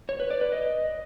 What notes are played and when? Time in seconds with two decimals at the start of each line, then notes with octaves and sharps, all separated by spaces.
0.09 C#5
0.20 B4
0.30 D5
0.41 B4
0.52 D#5